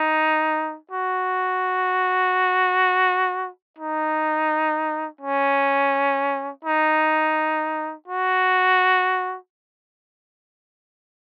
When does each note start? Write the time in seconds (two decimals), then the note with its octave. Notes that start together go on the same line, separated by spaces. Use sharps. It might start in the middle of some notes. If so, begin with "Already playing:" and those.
Already playing: D#4
0.91 F#4
3.78 D#4
5.21 C#4
6.65 D#4
8.08 F#4